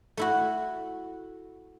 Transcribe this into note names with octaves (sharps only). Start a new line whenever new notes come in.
A3 E4 F#4